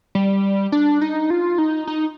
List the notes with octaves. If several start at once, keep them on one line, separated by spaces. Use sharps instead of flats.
G3
D4
D#4
F4
D#4
D#4